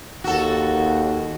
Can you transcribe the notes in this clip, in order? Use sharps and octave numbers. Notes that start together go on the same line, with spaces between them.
D#2 F#4 A4